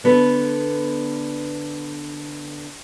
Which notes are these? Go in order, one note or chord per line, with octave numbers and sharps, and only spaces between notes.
D3 B3 A4 B4